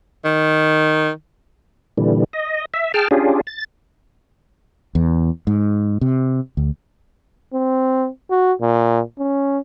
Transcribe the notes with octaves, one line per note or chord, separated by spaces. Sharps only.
D#3
A#2 D3 E3 G3
D#5
E5
G#4 G5 A5 F6
C#4 D4 F4 G4 G#4
A6
E2
G#2
C3
D2
C4
F#4
A#2
C#4